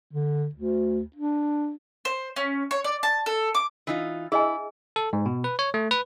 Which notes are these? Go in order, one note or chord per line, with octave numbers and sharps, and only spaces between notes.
D3
D2
D4
C5
C#4
C#5
D5
A5
A4
D6
E3 D#4 F4
E4 G#4 D#5 G#5
A4
G#2
B2
B4
C#5
A3
B4